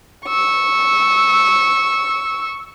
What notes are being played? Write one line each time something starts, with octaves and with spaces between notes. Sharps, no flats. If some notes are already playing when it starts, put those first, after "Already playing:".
C#6 E6